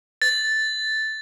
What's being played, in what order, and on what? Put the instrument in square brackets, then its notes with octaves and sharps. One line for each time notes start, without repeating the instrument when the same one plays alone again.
[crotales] A6